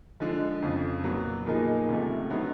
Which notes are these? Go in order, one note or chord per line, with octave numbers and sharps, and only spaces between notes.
D3 F3 G#3
F2 C#3 F3
A#2 F#3 B3
A#2 F3 A#3 D#4 G#4
C#2 C3 F3 A3
D3 F#3 B3 D#4